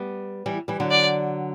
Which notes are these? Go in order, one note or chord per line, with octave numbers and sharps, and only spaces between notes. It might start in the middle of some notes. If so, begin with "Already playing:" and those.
Already playing: G3 B3
E3 G3
E3 G3
D3 F#3
D5